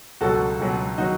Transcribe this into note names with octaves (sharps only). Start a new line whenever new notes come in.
C#2 B2 F#3 F#4 A4
C#2 B2 F#3
D#3 F#3 D#4 F#4